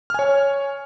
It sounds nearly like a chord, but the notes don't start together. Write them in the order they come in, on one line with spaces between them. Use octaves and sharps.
F6 G#5 C#5